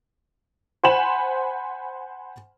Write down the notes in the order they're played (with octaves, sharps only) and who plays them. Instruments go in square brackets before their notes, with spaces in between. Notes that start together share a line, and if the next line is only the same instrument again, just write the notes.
[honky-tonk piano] C5 F#5 G#5 B5 E7 F#7